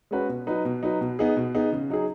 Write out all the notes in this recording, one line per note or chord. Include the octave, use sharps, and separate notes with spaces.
G#3 C#4 F#4 B4
B2
F#3 D#4 B4
B2
F#3 D#4 B4
B2
B3 D#4 G#4
B2
B3 D#4 G#4
C#3
F#3 D#4 G#4